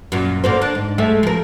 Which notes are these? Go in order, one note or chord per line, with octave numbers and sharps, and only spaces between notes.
F#2 A#2
D3 A#3 C5
D4
G#2
G#3 A3 E5
F3 A#4